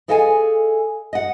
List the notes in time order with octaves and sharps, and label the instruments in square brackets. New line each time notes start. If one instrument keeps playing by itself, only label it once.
[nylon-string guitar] G#4 A4 D#5 F5 G5 G#5
D#5 F#5